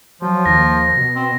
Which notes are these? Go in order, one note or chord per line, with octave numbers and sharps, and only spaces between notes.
F3 F#3
D#2 A#6
B2
C4